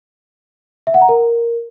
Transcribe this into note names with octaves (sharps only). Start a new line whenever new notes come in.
E5
F#5
A#5
A#4